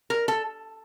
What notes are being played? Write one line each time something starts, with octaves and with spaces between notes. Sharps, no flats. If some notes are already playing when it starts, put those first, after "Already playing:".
A#4
A4